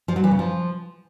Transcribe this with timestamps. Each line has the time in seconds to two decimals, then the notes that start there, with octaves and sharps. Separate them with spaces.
0.08 F3
0.16 F#3
0.24 E3
0.31 C#3
0.39 F3